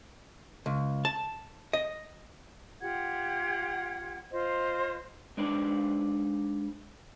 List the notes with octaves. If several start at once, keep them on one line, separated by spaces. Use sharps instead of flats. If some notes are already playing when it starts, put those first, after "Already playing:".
C#2
A5
D#5
F4 G4 F#5 G#6
F4 C5 D#5
G#3 D4 D#4 B4 C5 D5